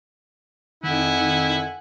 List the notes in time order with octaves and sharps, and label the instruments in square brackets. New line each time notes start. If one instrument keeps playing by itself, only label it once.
[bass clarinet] F2 [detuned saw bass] D#3 [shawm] E4 [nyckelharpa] F#5 G#5